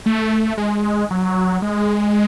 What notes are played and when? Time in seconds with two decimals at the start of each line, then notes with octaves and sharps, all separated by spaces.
0.06 A3
0.58 G#3
1.11 F#3
1.62 G#3